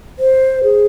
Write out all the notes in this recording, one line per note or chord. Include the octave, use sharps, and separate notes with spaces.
C5
G#4